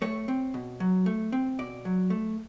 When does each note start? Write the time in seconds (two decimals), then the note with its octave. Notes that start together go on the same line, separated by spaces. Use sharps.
0.02 A3 C#5
0.28 C4
0.54 B2
0.80 F#3
1.06 A3
1.32 C4
1.59 B2 D5
1.85 F#3
2.10 A3